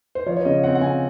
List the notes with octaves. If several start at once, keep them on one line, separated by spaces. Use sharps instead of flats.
C5
F3 C#5
C#5
C#3 D#5
C4 F#5
F#5
C#3 G#5